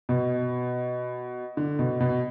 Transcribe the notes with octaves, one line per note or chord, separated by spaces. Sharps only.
B2
D3
B2
B2